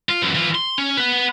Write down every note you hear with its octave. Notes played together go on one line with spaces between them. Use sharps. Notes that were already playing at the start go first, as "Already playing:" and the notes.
F4
F#2 E3
E3 F4
C6
C#4
B4 F#5